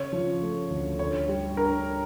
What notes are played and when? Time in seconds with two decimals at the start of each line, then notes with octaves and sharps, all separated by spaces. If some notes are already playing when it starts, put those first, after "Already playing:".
Already playing: C#3 C#5
0.13 F3
0.41 A3
0.70 D2
0.99 D3 C#5
1.28 G3
1.57 D4 A#4